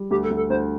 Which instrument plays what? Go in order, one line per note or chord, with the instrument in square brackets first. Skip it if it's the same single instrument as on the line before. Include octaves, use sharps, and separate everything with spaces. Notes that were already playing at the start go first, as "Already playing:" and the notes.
Already playing: [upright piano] G3
[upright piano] D2 [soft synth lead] G4
[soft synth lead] A4
[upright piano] D2
[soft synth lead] A4
[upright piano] D2 [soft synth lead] C5